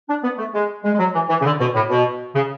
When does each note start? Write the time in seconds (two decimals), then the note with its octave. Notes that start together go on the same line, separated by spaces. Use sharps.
0.08 D4
0.23 B3
0.38 A3
0.53 G#3
0.84 G#3
0.94 G#3
0.98 F#3
1.14 E3
1.29 E3
1.40 C#3
1.45 D3
1.59 B2
1.75 A2
1.90 B2
2.35 C#3